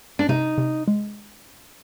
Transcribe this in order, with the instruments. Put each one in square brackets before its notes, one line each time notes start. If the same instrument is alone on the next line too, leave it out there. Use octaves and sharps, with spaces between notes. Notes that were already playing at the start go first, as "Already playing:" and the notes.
[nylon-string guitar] D4
[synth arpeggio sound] C3 [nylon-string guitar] D#4
[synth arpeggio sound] C3
G#3